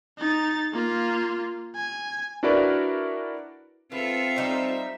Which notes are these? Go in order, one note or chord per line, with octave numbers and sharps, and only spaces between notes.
D#4 A6
A#3 F4
G#5
D4 E4 F#4 A#4 B4 D5
B3 C4 F4 A4 E5
G3 D#4 C5